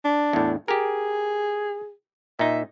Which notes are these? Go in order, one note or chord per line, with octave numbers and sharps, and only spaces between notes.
D4
E2 A2
G4 G#4 A#4
A#2 D#4 E5